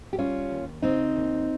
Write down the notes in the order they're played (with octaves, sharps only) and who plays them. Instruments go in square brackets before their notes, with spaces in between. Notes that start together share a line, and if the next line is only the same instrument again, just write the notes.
[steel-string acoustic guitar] G4
G3 C#4 F4
D#2
C#3 C4 D#4
D#2